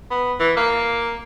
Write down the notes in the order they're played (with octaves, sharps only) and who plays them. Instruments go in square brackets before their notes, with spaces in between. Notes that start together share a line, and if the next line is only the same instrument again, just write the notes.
[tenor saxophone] B3
E3
A#3